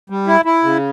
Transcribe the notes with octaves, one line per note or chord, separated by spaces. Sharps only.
G3
E4
E4
C#3